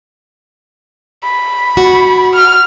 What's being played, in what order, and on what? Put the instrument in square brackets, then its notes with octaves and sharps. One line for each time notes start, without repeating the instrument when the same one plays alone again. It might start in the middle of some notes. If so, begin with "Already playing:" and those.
[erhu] B5
[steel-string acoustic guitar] F#4
[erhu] F6